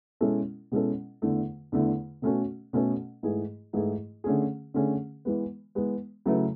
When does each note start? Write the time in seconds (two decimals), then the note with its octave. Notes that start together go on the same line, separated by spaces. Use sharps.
0.21 B2 G#3 C#4 E4 A4
0.72 B2 G#3 C#4 E4 A4
1.22 E2 D3 A3 E4
1.72 E2 D3 A3 E4
2.22 B2 A3 C#4 F#4 A4
2.73 B2 A3 C#4 F#4 A4
3.23 G#2 E3 A3 E4 G#4
3.73 G#2 E3 A3 E4 G#4
4.24 D3 A3 C#4 G#4
4.74 D3 A3 C#4 G#4
5.25 E3 G#3 B3
5.75 E3 G#3 B3
6.26 C#3 F#3 A3 E4 B4